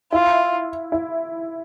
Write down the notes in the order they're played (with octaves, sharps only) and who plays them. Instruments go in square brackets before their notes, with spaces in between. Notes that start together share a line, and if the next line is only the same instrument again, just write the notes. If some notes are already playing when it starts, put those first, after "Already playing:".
[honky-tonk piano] E4 [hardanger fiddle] F4
[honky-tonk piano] E4